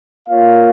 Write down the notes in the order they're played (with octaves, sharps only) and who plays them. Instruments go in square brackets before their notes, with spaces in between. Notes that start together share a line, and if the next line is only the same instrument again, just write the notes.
[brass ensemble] A#3 F4 A#4 C#5 F5